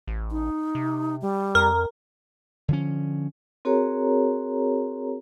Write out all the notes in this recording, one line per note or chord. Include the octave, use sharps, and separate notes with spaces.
A1
D#4
C3
G3
F2 A#4
D3 F3 C#4
C4 F#4 G#4 A#4 C#5 A#5